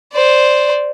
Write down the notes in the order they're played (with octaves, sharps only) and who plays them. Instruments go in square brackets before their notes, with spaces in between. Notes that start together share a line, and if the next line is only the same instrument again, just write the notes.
[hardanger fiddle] C5 D5